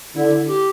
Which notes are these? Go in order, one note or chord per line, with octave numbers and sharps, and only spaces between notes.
D3 E4
G4